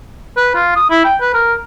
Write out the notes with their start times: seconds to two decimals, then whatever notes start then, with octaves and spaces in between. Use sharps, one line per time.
0.37 B4
0.55 F4
0.76 D#6
0.90 E4
1.05 G5
1.21 B4
1.34 A#4